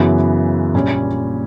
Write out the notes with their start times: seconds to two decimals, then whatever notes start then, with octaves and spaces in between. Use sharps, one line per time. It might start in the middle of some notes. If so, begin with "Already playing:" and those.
Already playing: F#2 C#3 E3 B3
0.74 A#1 A#2 G3 C#4